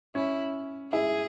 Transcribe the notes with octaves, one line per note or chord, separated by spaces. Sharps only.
C#4 E4
E4 G#4